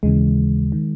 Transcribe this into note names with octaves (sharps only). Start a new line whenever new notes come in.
D#2 C#3 E3 G#3
D#3